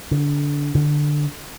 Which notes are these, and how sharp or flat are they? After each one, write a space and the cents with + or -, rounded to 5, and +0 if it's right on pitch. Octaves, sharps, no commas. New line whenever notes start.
D3 -20
D3 +10